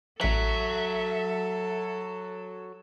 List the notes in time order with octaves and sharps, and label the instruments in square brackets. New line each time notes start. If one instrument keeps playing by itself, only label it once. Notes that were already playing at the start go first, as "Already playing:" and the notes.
[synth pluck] A1 B6 [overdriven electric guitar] F#3 [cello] A4 [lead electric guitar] E5